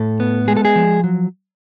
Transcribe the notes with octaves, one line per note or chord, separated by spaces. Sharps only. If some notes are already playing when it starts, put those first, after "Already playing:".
Already playing: A2 A4
B3
G#3 G#4
A4
G#4
F3
F#3